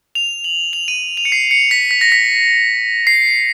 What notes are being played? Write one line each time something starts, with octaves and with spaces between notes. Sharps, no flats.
F7
F#7
F7
D#7
F7
C#7
C7
C#7
B6
B6
A#6
B6
C7